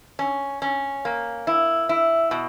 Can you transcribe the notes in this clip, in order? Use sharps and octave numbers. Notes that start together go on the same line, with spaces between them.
C#4
C#4
A#3
E4
E4
B2